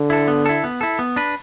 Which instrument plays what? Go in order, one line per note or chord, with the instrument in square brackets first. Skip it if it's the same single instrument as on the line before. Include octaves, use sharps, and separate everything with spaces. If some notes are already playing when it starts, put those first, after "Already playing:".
Already playing: [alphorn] D3
[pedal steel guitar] E4 A4
B3
E4 A4
B3
E4 A4
B3
D4 B4